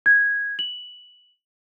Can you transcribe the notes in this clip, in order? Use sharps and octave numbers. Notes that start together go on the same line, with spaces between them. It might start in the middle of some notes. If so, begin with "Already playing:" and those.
G#6
F#7